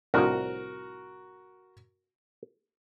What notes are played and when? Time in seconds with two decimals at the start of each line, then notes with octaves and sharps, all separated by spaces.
0.14 C2 A2 F3 F#4 A#4